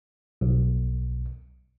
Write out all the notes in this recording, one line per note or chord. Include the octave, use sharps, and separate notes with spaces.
B1